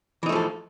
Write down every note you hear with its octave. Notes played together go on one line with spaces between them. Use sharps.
E3 F3 A3 D#4 A4